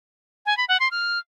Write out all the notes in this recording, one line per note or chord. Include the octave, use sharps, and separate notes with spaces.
G#5
B5
F#5
C6
F6